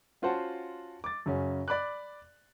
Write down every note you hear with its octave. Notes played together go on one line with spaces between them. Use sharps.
C#4 F4 F#4 C5 F#5 A5
D6 A6
F#2 C#3 C#4 F#4
D5 B5 D6 F#6